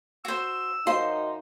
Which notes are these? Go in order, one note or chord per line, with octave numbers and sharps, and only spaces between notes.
F#4 C5 E6
F#2 D#4 F#4 C5 F5 C6